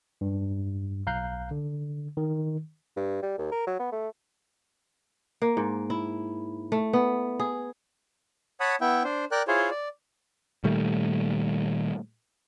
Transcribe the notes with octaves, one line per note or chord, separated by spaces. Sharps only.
G2
B1 F5 A#5 F#6 G6 C7
D3
D#3
G2
G3
D#2
A#4
F#3
B3
A3
A#3
G#2
E4
A3
B3
G#4
C#5 F#5 A5 B5 D#6
B3 E4 E5 G5
D4 C5
A#4 D5 G5 F#6
E4 F4 G#4 C5 C#5
D5
A#2 D#3 G3 A3